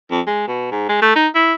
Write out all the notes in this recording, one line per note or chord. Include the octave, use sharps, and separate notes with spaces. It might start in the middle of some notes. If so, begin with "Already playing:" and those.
F2
G#3
B2
G#2
G#3
A3
D#4
E4